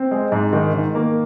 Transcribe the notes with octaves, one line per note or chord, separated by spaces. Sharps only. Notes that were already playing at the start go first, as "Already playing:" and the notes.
Already playing: C4
G#3
G#2
D#3
D#3
A#3